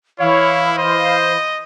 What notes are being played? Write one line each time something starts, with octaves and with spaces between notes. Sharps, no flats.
E3 E4 C#5 F5
C5 D#5